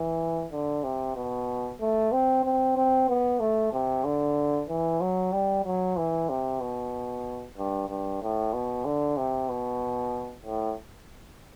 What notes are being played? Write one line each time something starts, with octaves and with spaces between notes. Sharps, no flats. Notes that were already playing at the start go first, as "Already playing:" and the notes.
Already playing: E3
D3
C3
B2
A3
C4
C4
C4
B3
A3
C3
D3
E3
F#3
G3
F#3
E3
C3
B2
G2
G2
A2
B2
D3
C3
B2
A2